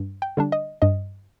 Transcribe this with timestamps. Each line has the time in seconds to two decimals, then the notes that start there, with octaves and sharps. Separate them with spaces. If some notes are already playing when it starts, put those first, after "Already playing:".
Already playing: G2
0.22 G5
0.37 D3 G3 D4
0.52 D#5
0.82 G2 D#5